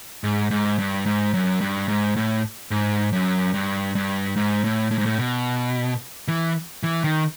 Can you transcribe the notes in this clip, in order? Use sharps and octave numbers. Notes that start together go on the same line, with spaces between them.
G#2
G#2
G2
G#2
F#2
G2
G#2
A2
G#2
F#2
G2
G2
G#2
A2
A2
G#2
A2
B2
E3
E3
D#3